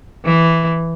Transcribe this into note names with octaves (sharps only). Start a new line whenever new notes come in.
E3